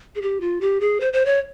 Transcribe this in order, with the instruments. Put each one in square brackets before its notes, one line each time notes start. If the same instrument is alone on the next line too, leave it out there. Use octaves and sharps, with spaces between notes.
[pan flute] G#4
G4
F4
G4
G#4
C5
C5
C#5